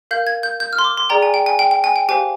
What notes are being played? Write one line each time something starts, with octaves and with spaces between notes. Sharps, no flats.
A#4 F5 G6
G#6
G6
G6
F6
C6
D6
C6
G#4 D5 G5 A#5
G#5
G5
G#5
G5
G5
G#5
G5
G4 C5 F5 G#5